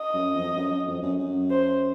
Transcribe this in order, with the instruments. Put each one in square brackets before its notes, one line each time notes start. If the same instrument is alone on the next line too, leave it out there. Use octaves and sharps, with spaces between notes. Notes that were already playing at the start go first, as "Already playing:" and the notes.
Already playing: [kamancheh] D#5
[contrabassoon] F#2
F2
F#2
F#2
F2
F#2
F#2
[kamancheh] C5